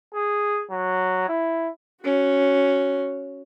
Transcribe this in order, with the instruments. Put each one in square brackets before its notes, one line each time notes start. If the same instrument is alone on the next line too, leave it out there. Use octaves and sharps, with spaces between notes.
[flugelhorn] G#4
F#3
E4
[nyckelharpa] C#4 F#4